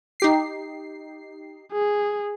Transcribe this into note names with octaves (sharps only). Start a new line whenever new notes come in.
D#4 G4 C7
G#4